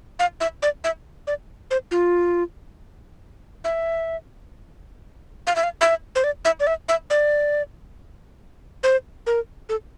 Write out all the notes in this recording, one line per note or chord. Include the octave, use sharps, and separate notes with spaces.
F5
E5
D5
E5
D5
C5
F4
E5
F5
E5
F5
E5
C5
D5
E5
D5
E5
E5
D5
C5
A#4
A4